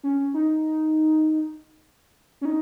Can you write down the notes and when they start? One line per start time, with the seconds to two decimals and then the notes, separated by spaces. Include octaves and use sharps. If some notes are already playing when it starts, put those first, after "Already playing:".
0.03 C#4
0.34 D#4
2.41 C#4
2.45 D#4